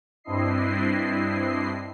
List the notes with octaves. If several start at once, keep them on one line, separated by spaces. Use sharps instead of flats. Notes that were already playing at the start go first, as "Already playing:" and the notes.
G2 C4 D4 E4 D#5 C7